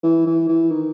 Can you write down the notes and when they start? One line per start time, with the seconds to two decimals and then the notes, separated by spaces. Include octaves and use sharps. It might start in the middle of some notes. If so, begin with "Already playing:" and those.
0.03 E3
0.26 E3
0.48 E3
0.71 D#3